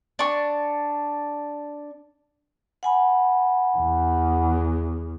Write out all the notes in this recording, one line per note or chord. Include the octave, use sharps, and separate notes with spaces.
D4 C#6
F#5 G#5 B5
E2